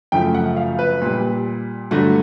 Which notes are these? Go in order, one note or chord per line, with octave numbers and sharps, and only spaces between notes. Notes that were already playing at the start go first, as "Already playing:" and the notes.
F#2 C#3 F3 A3 G5
F#5
F5
B4
A#2 G3
G2 D3 F#3 A3 F#4